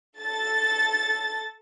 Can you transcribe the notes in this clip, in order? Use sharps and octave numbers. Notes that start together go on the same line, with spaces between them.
A4 A6